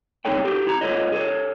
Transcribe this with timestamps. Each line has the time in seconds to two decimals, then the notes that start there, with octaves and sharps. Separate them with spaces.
0.25 C4 D#4 G#4 A4 C#5 G5
0.44 F#4 G4 A4
0.67 E4 A#5
0.81 F4 A4 B4 C#5 D#5
1.12 G#4 A4 C#5